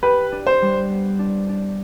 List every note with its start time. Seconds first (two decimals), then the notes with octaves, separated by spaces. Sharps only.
0.03 G4 B4
0.32 D4
0.47 C5
0.62 G3
0.90 B3
1.19 D4
1.49 D4